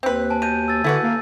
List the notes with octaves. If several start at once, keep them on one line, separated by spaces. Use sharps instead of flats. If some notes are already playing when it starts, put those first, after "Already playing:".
D#2 C4 B4
G#5 A5
B2 G6 D#7
E6 A6
D3 E4 F#4 B4
A#3